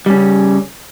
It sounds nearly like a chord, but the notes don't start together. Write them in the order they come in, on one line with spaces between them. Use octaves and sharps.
G3 C#4 C#3